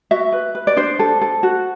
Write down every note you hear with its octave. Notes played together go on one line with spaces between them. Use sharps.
F#4 E5
B4
B4
D5
D4 C5
A4
A4
F#4